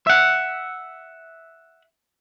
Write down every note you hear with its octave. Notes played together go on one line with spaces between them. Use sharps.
E5 F#5